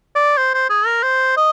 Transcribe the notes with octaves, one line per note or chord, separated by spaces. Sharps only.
D5
C5
C5
G#4
A#4
C5
D#5